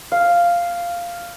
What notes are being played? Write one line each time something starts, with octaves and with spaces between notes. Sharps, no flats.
F5